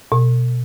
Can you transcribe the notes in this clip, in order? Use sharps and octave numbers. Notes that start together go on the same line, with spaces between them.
B2